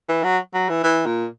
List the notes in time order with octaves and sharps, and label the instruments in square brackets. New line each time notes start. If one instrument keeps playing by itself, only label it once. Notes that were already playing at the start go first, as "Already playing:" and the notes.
[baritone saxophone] E3
F#3
F#3
E3
E3
A#2